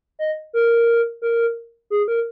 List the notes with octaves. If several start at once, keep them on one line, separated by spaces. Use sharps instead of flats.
D#5
A#4
A#4
G#4
A#4